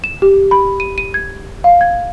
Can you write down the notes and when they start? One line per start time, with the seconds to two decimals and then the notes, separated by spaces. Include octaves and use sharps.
0.04 E7
0.22 G4
0.51 B5
0.80 D#7
0.98 D#7
1.14 G#6
1.64 F5
1.81 G#6